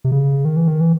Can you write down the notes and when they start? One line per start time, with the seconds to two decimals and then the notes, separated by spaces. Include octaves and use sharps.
0.04 C3
0.12 C#3
0.45 D#3
0.57 E3
0.68 D#3
0.81 E3